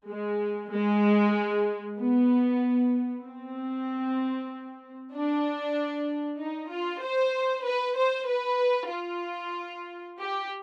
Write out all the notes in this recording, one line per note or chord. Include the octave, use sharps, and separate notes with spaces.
G#3
G#3
B3
C4
D4
D#4
F4
C5
B4
C5
B4
F4
G4